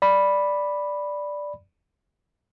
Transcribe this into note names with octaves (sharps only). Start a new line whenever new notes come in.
D5 B5